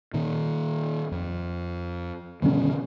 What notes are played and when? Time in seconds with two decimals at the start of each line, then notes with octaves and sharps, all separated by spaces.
0.14 A#2 D#3
1.12 F2
2.42 G1 B2 D3 D#3 C#4